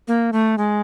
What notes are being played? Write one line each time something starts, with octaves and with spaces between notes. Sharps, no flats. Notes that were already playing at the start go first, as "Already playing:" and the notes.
A#3
A3
G#3